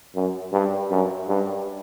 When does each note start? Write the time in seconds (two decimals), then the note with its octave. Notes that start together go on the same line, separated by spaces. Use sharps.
0.15 F#2
0.52 G2
0.90 F#2
1.29 G2